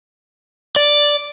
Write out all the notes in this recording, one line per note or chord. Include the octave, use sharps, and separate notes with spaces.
D5